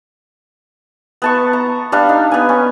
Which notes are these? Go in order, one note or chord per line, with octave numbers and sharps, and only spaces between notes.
B3 A5 C#6
A#5
G3 D4 F5
D#4
B3 G#5
C#4